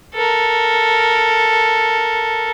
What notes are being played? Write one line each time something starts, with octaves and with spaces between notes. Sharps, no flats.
A4 A#4